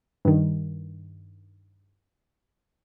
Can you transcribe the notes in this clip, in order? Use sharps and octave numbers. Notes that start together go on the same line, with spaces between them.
G2 D#3